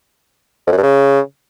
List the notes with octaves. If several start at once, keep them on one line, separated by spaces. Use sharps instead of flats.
F2
F#2
G2
C#3